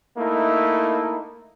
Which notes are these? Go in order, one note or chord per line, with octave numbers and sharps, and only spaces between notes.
A3 A#3 D#4 E4